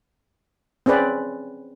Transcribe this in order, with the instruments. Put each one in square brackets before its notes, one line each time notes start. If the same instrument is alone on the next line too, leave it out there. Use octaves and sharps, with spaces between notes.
[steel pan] C4 C#4 G#4 B4 D5